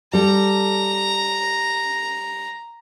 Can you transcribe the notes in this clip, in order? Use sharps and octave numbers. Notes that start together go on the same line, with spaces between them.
G3 A4 A#5